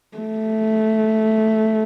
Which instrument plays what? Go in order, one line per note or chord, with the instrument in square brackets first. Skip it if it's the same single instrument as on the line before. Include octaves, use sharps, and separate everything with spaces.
[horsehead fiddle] A3